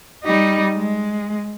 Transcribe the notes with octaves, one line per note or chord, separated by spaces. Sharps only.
G3 D#4
G#3